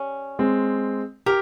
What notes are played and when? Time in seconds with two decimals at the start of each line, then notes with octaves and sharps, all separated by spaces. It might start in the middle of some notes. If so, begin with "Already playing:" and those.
Already playing: G3 C#4
0.39 G#3 C4
1.26 G4 A#4